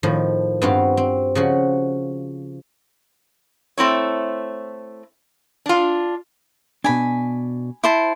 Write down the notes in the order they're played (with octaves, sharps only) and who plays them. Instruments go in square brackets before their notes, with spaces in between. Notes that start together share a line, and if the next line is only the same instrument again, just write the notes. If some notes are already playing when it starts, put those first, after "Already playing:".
[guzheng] A2 D#3 F3
G2 B3 C4 F4 F#4 F5
C4
C#3 F3 F#4
[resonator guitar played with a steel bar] A3 C4 E4 C#5
D4 F4
[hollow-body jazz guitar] B2 D4 [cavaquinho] G#5 B5
[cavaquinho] E4 C5 A5